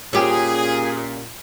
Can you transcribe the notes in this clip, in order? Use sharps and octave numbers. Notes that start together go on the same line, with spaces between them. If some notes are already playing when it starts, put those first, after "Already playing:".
A#2 C#4 G4 G#4